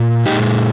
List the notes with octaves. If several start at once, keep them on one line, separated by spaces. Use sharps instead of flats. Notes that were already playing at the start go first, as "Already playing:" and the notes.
Already playing: A#2
A#2 G#3 D#4 G4